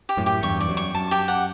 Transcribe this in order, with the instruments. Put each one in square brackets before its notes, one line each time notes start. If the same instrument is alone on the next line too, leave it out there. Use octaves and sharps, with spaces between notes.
[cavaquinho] G4
[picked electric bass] F#2 A2
[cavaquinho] G4
[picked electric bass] E2 G2 [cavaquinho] C#6
[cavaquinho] D5
[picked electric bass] F#2
[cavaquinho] C#6
[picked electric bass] F#2 [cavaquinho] A5
[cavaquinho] G4
F#5